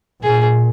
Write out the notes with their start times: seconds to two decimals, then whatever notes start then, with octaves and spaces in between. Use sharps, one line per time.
0.23 A#2 G#4